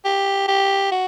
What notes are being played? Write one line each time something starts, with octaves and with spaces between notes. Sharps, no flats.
G4
G4
F#4